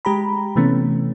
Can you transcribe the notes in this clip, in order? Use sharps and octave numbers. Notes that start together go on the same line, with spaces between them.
G#3 G4 A#5 B5
C3 E3 A3 B3 C#4